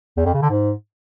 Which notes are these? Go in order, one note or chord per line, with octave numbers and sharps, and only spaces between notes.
E2
F2
C#3
D3
G#2